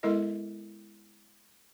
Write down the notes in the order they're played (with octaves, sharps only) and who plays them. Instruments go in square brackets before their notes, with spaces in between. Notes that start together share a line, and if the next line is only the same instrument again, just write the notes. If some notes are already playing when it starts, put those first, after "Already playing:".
[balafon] G#3 B3 E4 A4 A#4 D#5